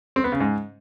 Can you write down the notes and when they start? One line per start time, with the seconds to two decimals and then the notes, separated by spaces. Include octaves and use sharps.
0.16 C4
0.24 B3
0.32 C#3
0.40 G#2